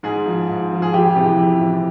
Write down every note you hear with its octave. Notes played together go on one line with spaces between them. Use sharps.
G#2 G#4
F3
G#2
F3
G#4
F2 G4
C3 E3
F2
C3 E3